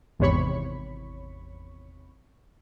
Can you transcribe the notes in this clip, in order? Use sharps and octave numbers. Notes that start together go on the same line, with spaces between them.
G#1 E2 C3 C#5 B5 C#6